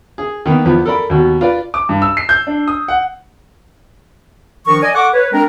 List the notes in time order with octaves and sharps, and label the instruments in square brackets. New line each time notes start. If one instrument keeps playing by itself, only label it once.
[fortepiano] G#4
D#3 A#3 B3
E2 F3 B3
A4 A#4 D5 B5
D#2 B2
F4 B4 D5
[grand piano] D6
G2
E6
C7
G6
D4
D#6
F#5
[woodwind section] D#3 F3 D4 A#4 C#6
D5 D#5 G#5
A4 F#5 C#6 D6
B4 C#5
G#3 C4 D4 A#4